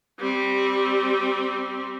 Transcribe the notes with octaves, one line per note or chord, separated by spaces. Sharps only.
G3 C4